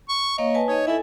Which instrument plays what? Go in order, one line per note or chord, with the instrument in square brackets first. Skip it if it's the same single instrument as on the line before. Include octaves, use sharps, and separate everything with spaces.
[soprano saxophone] C#6
[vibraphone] A#3 C#5 F5 [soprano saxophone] D#5
[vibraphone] B4 G#5 A5
[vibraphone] D#4 D#5 [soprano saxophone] C#5
[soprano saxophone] E4 [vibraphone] A4 G#5